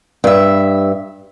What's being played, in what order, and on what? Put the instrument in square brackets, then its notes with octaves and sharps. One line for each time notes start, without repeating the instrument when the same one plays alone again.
[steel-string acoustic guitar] G2 E5